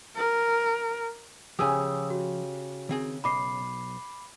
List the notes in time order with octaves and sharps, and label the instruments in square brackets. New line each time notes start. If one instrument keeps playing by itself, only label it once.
[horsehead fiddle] A#4
[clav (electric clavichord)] C#3 G4 [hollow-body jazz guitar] F3 G#4 G#5 [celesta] D#6 E6
[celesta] F#4
[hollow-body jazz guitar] D#3 C4 G#4
[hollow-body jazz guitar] B1 D#5 [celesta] B5 D6 C7